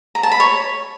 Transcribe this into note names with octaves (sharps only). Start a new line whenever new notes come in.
A#5
A5
B5
C#5